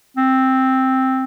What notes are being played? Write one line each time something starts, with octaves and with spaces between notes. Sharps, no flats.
C4